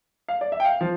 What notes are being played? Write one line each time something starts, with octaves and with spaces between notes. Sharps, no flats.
F5
D5
E5
G5
F5
F3